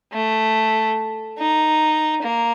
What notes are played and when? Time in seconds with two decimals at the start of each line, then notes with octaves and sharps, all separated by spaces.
0.13 A3
1.38 D#4
2.23 A#3